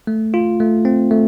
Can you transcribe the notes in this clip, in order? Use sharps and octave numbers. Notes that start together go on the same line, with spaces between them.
A3
F4
A3
C4
A3